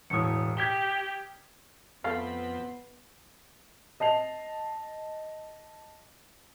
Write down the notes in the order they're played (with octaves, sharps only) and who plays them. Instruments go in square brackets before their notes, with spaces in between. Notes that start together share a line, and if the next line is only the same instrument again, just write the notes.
[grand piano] E1 A2 [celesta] D#6 C#7
[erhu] G4 [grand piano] G#6 B6 G7
[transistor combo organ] F2 C4 B5 [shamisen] A3 F5 [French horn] B3 [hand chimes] C7
[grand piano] D#5 A5 C7 F7